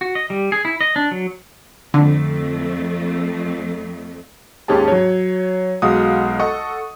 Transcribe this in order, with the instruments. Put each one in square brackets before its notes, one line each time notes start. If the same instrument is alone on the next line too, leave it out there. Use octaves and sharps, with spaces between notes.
[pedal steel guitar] F#4
D#5
G3
G#4
E4
D#5
D4
F#3
[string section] F2 A3 [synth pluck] D3
[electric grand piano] D#2 G#2 C#4 G4 G#4 A5
F#3 C#5
B1 G#3 F#4 F5 F#5 D#6
A4 D#5 F#5 C#6 D#6